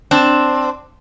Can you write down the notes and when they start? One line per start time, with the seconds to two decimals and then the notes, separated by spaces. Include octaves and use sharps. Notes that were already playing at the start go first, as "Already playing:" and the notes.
0.11 C4 D4